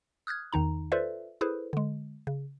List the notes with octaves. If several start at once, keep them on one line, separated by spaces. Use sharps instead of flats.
D#6 F6 F#6 G#6
E2 D#3 D#4 A#5
F4 A4 B4 C5 D5 E5
E4 G#4 A4 B4 C5
D3 G#3
C#3